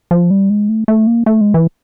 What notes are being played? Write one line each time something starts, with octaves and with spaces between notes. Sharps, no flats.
F3
G3
G#3
A3
A3
A#3
A3
G#3
E3